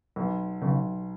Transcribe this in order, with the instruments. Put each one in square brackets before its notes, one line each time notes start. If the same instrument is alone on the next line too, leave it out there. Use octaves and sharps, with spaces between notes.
[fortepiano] B1
[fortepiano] B1 [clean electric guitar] C#3